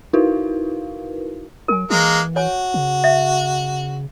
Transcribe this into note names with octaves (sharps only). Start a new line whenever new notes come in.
D#4 E4 F#4 A#4 B4 F5
F#3 A#4 G#5
E3 G#3 A#3
F#4 C#5 G#5
C#3
E5